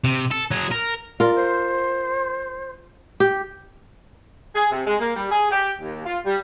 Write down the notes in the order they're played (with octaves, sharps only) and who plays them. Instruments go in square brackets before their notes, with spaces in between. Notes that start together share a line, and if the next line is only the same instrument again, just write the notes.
[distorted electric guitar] C3
A4
F#3 G#4
A#4
[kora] F4 A#4 [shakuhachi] D5
[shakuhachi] C5
[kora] G4
[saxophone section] G#4
C3
G#3
A#3
G3
G#4
G4
D#2
F4
G3